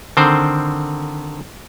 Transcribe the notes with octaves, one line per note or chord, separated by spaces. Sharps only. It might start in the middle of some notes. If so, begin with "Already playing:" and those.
D3 D#3 C4 C5